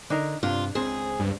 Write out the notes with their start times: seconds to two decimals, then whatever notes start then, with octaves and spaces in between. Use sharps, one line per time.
0.10 D3 D4 D#4 A#4
0.43 G2 C3 D4 F4
0.75 C#2 C4 G#4 C5
1.20 G2